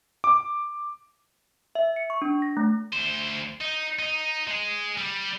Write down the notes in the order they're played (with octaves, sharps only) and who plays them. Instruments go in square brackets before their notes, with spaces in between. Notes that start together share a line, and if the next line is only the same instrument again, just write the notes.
[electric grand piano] D6
[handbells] E5
C#7
C#6
D4
A#6
A3
[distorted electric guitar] D2 C5
D#4
D#4
G#3 G#4
G3